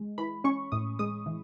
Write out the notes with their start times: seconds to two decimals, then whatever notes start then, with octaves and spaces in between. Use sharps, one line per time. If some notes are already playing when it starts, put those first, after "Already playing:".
Already playing: G#3
0.18 E3 B5
0.44 C#4 C#6
0.72 A2 D#6
0.99 G#3 D#6
1.26 E3